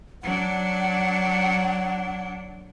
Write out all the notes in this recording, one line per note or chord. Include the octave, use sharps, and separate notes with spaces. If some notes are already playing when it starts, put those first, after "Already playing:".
F#3 D4 F#5